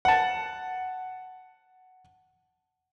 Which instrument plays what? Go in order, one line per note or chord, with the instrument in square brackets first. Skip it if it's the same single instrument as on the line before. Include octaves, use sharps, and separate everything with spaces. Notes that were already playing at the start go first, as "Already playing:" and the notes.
[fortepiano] F#5 A5